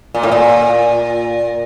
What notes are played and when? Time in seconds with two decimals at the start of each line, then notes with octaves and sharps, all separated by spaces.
0.14 A#2
0.23 A2
0.31 A#2